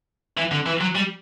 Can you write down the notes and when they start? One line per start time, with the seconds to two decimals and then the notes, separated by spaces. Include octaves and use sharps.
0.37 E3
0.51 D3
0.66 E3
0.81 F#3
0.95 G3